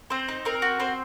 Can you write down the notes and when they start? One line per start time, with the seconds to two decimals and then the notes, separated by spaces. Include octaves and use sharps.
0.10 C4 C5
0.28 D#4
0.45 C4 A#4
0.62 F#4
0.80 C4 C5